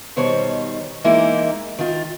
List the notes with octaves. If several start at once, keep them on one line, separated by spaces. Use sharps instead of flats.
B2 D#3 G3 C5 C#5
E3 G#3 A#3 D#4 E4
D#3 F4